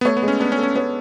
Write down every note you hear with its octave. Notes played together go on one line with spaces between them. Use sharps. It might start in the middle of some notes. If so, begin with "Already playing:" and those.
B3
A3 C#5
B3
G#3
C#4
B3 D4
C#4
A4
C#4
B3 C#5